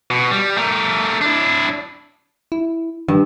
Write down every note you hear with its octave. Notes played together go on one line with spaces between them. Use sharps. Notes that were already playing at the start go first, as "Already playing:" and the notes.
B2
G3
A3 A#4
D4 E4
E4
G2 D#3